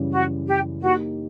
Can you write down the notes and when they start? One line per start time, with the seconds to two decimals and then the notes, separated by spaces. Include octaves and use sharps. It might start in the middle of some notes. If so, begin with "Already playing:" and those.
Already playing: F#2 C#3 E3 G3
0.12 F#4
0.47 G4
0.82 A#3 D#4 F#4 G4